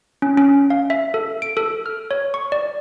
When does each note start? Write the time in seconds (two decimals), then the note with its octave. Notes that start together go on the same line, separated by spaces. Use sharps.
0.22 C#4
0.38 C#4
0.70 F5
0.90 E5
1.14 A4
1.42 D7
1.57 A4
1.86 F6
2.11 C#5
2.34 C#6
2.52 D5